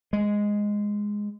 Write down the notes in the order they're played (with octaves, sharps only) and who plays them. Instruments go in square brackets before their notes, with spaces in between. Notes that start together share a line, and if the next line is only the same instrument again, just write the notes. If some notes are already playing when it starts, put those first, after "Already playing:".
[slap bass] G#3